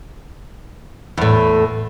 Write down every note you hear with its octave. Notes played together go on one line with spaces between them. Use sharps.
E2 A2